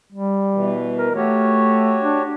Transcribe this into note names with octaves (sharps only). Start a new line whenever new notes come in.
G3
B2 E3
A#4
A3 F#4 G4 C#5
D4